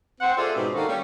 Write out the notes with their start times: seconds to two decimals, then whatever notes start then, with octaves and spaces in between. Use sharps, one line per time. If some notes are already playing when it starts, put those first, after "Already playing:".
0.20 C4 C5 F#5
0.37 F4 G#4 A4 C5 D5 E5
0.54 G#2 B2 C4 C#4 G4 G#4
0.74 D#3 A#3 D4 F#4 A4 D5
0.87 G3 C#4